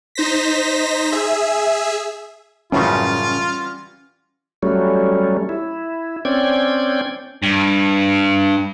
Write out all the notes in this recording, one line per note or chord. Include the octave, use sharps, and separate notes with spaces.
D#4 C5 A#6 B6
G#4 E5
F#2 A2 C#3 E3 G3 C#4 F4 F#4
F#3 G3 A3 C#4
E4
C4 C#4 D5 G5 G#6
G2